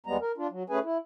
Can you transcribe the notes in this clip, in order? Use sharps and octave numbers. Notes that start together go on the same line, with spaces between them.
D#2 G3 G#3 B3 A#5
A#4
D4 F4
F#3
A3 C#4 G#4 B4 G#5
E4